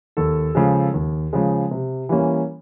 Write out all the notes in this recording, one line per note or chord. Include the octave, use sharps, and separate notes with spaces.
D#2 A4
C#3 F3 G#3
D#2
C#3 F3 G#3
C3
E3 G3 A#3 C#4